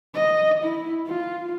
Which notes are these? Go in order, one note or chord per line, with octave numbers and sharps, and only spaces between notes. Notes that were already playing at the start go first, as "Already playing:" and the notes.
D#5
E4
F4